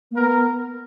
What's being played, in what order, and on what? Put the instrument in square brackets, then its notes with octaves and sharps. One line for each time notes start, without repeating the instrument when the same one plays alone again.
[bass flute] A#3
[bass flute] B3 [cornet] A#4